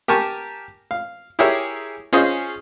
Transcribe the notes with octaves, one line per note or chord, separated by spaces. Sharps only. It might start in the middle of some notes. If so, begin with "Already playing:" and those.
G4 A#4 G#5 A5 C#6
F5
E4 G4 G#4 A#4 C#5 E5
C#4 F4 G#4 C5 D#5